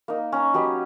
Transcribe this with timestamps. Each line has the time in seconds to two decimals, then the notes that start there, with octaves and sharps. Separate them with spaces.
0.08 A#3 D#4
0.32 C#4 A#5
0.54 F#3 G4 B4 D#5